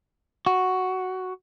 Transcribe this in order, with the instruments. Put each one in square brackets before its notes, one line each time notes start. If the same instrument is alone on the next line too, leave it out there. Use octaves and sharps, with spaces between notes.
[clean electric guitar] F#4